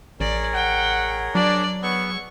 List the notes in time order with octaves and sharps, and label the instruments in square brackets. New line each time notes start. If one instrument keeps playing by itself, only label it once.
[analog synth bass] A1 [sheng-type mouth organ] G#4 A#4 C#5 [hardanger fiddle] D5
[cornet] F#5 [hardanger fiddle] G5
[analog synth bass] F#3 [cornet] D4 [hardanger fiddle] D5
[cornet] B3 [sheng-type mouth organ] G#4 C#5 E6 [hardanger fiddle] C#6